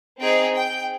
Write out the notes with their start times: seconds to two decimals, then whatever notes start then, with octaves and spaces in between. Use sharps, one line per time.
0.19 C4 D#4 G#4 G5
0.53 G5